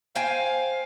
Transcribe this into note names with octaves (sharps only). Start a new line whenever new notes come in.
C5 F5 G5 G#5